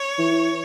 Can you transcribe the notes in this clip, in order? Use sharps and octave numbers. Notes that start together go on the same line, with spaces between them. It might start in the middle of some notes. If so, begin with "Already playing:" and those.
Already playing: C#5
E3